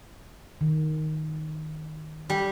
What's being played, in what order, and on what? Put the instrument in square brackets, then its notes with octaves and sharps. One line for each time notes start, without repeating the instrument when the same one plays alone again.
[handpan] D#3
[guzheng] G3